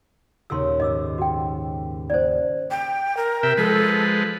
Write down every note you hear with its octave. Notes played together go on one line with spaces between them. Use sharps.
D#2 A#2 C#3 A#4 C6 E6
G#2 D#5 D6 E6
F#4 G5
A#3 C5 D5
G5
A#4
C3 E5 G5
F3 G#3 A4 B4